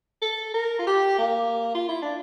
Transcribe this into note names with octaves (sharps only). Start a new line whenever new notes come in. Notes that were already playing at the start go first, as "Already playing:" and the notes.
A4
A#4
F4
G4
A#3
F4
E4
D4